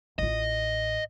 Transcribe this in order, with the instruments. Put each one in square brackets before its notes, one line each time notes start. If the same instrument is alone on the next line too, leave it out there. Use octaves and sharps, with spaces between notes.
[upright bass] A1 F4 [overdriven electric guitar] D#5